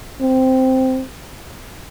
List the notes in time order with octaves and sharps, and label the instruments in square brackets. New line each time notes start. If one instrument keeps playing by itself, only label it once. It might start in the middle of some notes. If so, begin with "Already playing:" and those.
[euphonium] C4